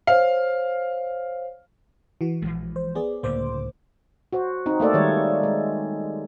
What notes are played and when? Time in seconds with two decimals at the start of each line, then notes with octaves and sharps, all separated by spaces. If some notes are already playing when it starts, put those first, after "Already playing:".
0.07 C5 C#5 F5
2.21 E3 F#4
2.42 A#1 E3 F3 G#3
2.76 C5
2.95 B3 G#4 D5
3.23 C#2 A2 D3 A#3 C5 D6
4.33 F#4 C5
4.66 C4 D#4
4.80 A3 A#3 A4 D5
4.94 D#3 G3 G#3 C#5
5.43 G#3